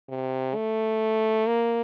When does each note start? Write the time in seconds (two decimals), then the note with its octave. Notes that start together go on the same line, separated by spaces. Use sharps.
0.09 C3
0.55 A3
1.47 A#3